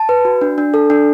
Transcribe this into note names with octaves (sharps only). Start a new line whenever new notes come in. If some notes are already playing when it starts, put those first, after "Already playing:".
Already playing: A5
B4
F#4
D4
D4
A4
D4